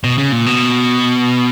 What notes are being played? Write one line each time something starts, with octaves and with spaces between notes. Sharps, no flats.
B2
C#3
A#2
B2